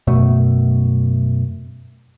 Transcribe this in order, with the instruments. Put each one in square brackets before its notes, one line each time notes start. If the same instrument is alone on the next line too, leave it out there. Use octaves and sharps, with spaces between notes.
[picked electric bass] F#2 B2 A3